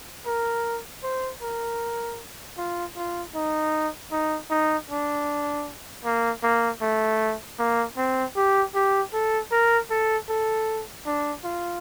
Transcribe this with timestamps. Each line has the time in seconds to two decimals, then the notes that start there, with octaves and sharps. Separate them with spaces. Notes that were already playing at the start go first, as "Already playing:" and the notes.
0.26 A#4
1.03 C5
1.42 A#4
2.58 F4
2.97 F4
3.35 D#4
4.12 D#4
4.50 D#4
4.89 D4
6.05 A#3
6.43 A#3
6.81 A3
7.59 A#3
7.97 C4
8.36 G4
8.75 G4
9.13 A4
9.52 A#4
9.90 A4
10.29 A4
11.06 D4
11.44 F4